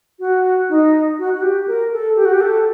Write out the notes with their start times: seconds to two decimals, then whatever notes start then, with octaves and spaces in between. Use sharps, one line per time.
0.20 F#4
0.69 D#4
1.19 F#4
1.33 F#4
1.42 G4
1.67 A#4
1.92 A4
2.16 G4
2.25 F#4
2.33 G4
2.41 A4